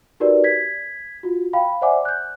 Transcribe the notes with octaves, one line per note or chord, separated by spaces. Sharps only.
D#4 F#4 G4 A#4 B4 D5
G#6 B6
F4 F#4
F5 G5 B5
C5 D5 E5 F#5 G#5 D6
F#6 G6